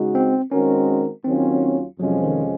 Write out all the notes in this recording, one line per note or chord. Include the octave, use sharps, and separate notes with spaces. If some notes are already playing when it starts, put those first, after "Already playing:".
Already playing: C#3 G#3 D#4 F#4
C4
D#3 G#3 C4 C#4 F#4 A#4
D#2 D#3 F#3 C4 C#4 F4
F2 C3 F3 F#3 G#3 C#4
D#3